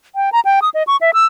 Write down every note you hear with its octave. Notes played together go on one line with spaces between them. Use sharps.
G5
A#5
G5
D#6
D#5
C#6
E5
E6